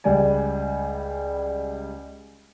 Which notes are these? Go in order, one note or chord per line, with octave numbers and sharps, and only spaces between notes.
C#2 G3 D5 G#5